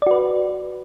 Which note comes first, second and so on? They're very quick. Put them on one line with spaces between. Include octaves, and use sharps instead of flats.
D5 F#4 B4